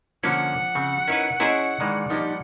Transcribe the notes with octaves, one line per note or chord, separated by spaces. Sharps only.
D3 F3 A#3 C#4 D4 F#5
C#3 C4
D#3 C#4 E4 B4
C#4 E4 G#4 D#5 E5 A#5 C6
D#3 E3 G#3 D4
F3 G3 A#3 D#4